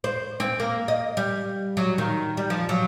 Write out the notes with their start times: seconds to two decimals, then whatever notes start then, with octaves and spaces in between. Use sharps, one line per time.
0.04 C5
0.40 C4
0.60 A#3
0.88 D#5
1.17 G3
1.77 F#3
1.98 D#3
2.37 G3
2.50 F3
2.69 F#3